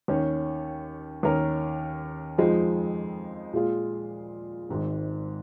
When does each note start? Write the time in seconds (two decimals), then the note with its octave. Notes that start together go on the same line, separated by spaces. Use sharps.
0.08 D#2 D#3 C#4
1.23 D#2 D#3 C#4 A#4
2.38 F2 F3 G#3 D#4
3.53 A#2 G#3 F4 G#4
4.69 G#1 G#2 D#3